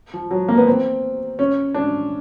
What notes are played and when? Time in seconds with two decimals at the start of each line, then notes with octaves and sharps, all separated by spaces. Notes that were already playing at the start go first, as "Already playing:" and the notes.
0.14 F3
0.31 F#3
0.48 A#3
0.57 B3
0.67 C4
1.39 C#4
1.74 D4